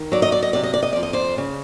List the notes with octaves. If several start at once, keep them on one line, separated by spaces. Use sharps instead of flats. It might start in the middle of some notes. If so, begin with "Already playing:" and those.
Already playing: D#3
F#3 D5
D#5
D5
D#5
C3 D5
D#5
D5
D#5
F2 D5
D#5
C5 D5
C#3